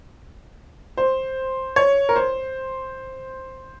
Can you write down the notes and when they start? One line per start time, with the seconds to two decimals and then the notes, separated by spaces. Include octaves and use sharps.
0.97 C5
1.76 C#5
2.09 A#4
2.16 C5